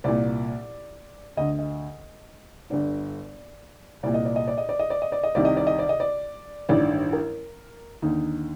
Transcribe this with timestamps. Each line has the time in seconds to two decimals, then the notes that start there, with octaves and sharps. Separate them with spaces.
0.04 C2 A#2 D5
1.37 D2 D3 D#5
1.59 D#5
2.70 G1 G2 D3 D5
4.03 C2 A#2 D5
4.14 D#5
4.25 D5
4.36 D#5
4.47 D5
4.58 D#5
4.69 D5
4.79 D#5
4.90 D5
5.02 D#5
5.12 D5
5.24 D#5
5.35 C2 C3 D#3 D5
5.45 D#5
5.57 D5
5.67 D#5
5.79 D5
5.89 D#5
6.00 D5
6.69 A1 G2 D#3 D5
7.13 A#4
8.02 D#2 D3 D#4